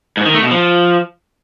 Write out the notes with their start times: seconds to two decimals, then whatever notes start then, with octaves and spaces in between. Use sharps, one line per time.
0.17 G#2
0.26 D#3
0.34 A3
0.43 B2
0.51 F3